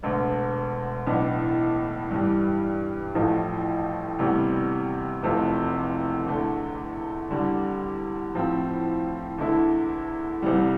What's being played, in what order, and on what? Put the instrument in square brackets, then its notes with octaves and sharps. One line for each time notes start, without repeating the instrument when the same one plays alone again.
[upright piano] E1 D2 D3
B1 A2 E3 B3 D4
G2 E3 G3
A1 A2 F3 A3
D2 C3 E3 G3 B3
F1 E2 C3 F3 A3
E2 D3 A3
E2 D3 G3
A2 F3 C4
E2 D3 A3 E4
C2 C3 E3 G3